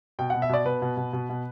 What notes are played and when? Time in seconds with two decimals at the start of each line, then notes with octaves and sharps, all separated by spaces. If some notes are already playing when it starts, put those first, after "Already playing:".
0.19 B2 G5
0.30 B2 F#5
0.42 E5
0.49 B2 D5
0.65 B2 B4
0.82 B2
0.97 B2
1.13 B2
1.29 B2